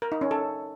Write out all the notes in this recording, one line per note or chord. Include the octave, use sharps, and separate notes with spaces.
A#4
D#4
C#4
A4